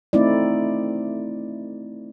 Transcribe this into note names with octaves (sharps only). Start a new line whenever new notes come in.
A3 C4 D#4 E4 D5